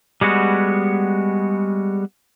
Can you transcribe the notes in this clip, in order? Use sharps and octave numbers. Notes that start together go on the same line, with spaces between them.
G3 G#3 B3 F#4